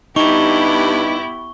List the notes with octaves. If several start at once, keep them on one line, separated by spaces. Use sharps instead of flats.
G2 B3 D#4 E4 G4 C#6 G7